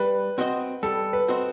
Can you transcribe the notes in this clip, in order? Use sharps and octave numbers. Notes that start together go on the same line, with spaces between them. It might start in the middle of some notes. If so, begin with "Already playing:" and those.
Already playing: G3 B4
C4 F#4 C5 D#5
G3 A4
B4
C4 F#4 C5 D#5